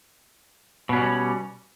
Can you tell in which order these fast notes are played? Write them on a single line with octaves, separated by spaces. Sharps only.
B2 C#4 G3